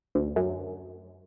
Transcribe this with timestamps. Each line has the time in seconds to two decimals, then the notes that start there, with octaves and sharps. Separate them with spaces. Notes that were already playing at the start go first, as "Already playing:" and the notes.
0.15 D2
0.36 F#2